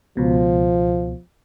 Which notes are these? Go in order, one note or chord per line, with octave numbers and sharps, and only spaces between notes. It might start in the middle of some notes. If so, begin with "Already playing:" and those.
C#2 B2 F3